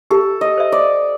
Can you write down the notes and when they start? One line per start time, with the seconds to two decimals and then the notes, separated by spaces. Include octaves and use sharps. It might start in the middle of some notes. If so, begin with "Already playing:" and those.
0.10 G4 A4
0.41 D#5
0.58 C5 E5
0.72 D5